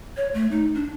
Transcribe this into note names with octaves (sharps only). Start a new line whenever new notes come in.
C#5
A3
D#4
D4